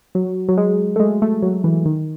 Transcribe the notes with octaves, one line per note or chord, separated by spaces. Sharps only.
F#3
F#3
G#3
A3
G#3
A3
F#3
E3
D#3